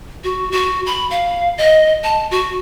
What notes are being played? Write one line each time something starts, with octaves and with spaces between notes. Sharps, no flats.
F#4
F#4
B5
F5
D#5
A5
F#4